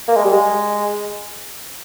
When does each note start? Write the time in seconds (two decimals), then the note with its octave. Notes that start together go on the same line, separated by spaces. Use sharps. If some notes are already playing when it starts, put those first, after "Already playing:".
0.08 A#3
0.16 G#3
0.25 G3
0.32 G#3